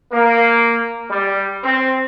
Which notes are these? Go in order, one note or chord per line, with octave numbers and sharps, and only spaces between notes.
A#3
G3
C4